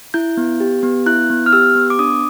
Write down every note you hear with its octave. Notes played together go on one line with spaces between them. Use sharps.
E4 G6
B3
G4
B3
E4 F#6
B3
F6
G4 E6
B3
D6
D4 D#6